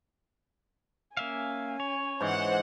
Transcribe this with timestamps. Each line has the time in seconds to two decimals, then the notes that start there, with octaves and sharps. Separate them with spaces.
1.17 A#3 C#4 E5 F5 G#5
1.80 C#5
2.21 G#2 E3 C5 F#5